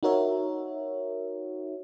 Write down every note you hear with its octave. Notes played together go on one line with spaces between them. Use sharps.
D#4 F#4 A#4 C#5 E5